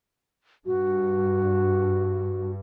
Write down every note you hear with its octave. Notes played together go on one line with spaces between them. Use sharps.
G2 F#4